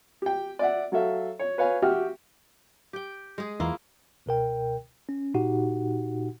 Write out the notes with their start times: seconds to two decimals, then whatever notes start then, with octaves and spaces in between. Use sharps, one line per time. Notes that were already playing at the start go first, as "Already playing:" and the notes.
0.22 G4 G5
0.59 D5 E5 F#5
0.92 F#3 F#4 A4 E5 F5
1.39 C#5
1.58 B4 C#5 F5 G#5
1.82 F#4 G4 E5 G5 F6
2.93 G4 G5
3.38 G#3 G#4
3.60 E2 A#3 E4 F4
4.26 C#2 B2 A#4 G5
5.09 C#4
5.34 A#2 D#4 F#4 G4 F#5